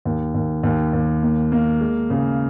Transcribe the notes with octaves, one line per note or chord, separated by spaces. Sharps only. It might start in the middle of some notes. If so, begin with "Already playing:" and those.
D#2
D#2
D#2
D#2
A#3
A#3
G#3
C#3